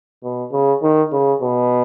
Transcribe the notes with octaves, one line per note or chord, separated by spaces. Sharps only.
B2
C#3
D#3
C#3
B2